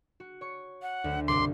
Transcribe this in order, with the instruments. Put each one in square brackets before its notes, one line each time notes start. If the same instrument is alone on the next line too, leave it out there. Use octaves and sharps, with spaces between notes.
[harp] F#4
C#5 C#6
[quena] F#5
[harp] D2 E5
[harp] G1 C2 [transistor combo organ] C6 [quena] D6